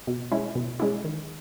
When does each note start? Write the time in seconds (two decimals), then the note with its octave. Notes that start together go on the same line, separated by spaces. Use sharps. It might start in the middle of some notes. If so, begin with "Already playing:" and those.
0.07 B2
0.32 G#3 C#4 E4
0.55 B2
0.80 G#3 C#4 E4
1.04 D#3